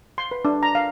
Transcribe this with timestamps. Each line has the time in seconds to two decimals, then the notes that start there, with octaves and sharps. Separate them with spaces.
0.18 C6
0.31 B4
0.45 D4
0.63 A#5
0.75 F5